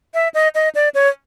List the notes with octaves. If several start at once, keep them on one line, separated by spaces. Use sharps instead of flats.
E5
D#5
D#5
D5
C#5